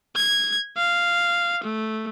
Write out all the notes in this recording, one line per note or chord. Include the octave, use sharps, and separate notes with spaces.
G#6
F5
A3